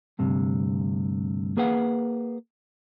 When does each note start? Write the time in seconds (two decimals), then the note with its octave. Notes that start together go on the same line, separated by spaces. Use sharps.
0.19 D2 G2 C3
1.57 A#3 G#4 B4 F5 F#5